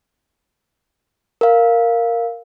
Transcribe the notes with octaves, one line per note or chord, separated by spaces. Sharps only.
A#4 F5